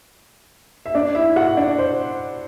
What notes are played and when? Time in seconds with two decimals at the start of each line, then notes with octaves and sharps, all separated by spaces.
0.86 E5
0.95 D4 D5
1.15 E4 E5
1.36 F#4 F#5
1.57 D4 D5
1.78 C5